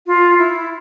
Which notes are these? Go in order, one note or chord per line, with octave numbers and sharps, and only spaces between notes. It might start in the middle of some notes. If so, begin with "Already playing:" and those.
F4
E4